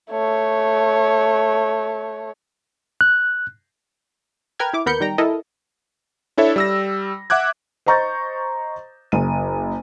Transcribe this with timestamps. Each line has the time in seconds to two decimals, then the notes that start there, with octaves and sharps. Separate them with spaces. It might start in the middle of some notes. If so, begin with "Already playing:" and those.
0.11 A3 C#5
3.01 F#6
4.59 A#4 B4 G5 F6 G#6
4.73 E4 D6
4.86 D#2 B3 A#4 B5 G6 C#7
5.00 D#3 G3 G5 A#5
5.18 E4 A4 A#4 D#5
6.38 D4 E4 A4 C#5 E5
6.56 G3 E6 A#6
7.30 E5 F#5 D6 F#6 G#6
7.86 C5 D#5 A#5 C#6 G6 A6
9.12 F#1 D#7